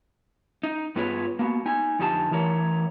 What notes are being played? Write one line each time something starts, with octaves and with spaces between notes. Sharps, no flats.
D#4
G2 B3 F4 G#4 B4 C#5
A#3 B3 F#4
D#4 G#5
F2 D3 D#4 G4 G#5 A5
E3 A3 A#4 C#5